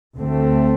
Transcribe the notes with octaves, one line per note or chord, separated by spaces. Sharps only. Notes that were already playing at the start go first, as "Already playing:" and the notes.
D2 D3 A3 C4